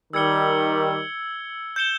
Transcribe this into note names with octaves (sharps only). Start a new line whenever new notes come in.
D#3 G3 E6 G#6 C#7 G7
G6 C#7 E7 G7